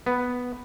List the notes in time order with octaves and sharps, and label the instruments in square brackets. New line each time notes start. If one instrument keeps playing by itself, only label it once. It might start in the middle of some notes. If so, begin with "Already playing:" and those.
[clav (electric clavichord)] B3